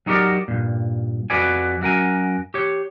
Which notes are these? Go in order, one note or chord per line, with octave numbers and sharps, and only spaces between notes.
F#3 D#4 F#4 G4 A#4 D5
G2 A#2
F2 F#4 B4 D5 G#5
F#2 F#4 A#4 G#5
G4 C#5